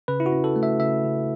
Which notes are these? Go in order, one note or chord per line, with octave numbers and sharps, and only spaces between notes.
C#3 B4
E4
F#4
C#4
A4
A3
E5
C#3 E5
C#3